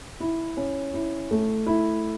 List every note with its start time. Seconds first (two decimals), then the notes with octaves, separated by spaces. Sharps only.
0.20 E4
0.57 C#4
0.94 E4
1.31 A3
1.66 E4